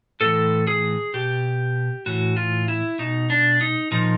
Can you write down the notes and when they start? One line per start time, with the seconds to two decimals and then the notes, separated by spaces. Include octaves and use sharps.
0.20 A2 E3 A4
0.67 G#4
1.14 B2 G4
2.06 A2 E3 F#4
2.37 F4
2.68 E4
2.99 B2 D#4
3.30 D4
3.61 D#4
3.91 A#2 F3 D#4